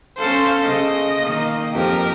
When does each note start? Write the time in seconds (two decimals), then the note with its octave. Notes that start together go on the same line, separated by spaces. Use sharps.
0.18 C#4 A4 C5 F5
0.65 C#3 D#5
1.20 D#3 A#3
1.74 F2 G4 A#4